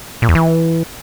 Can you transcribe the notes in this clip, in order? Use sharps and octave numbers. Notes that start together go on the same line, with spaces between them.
A#2
E2
E3